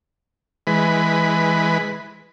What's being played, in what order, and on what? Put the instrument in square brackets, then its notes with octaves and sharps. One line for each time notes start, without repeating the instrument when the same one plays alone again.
[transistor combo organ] E3 G#3 B4